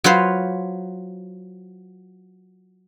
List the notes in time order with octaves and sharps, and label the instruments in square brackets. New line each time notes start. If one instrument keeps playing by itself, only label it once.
[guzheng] F#3 F4 B4 C5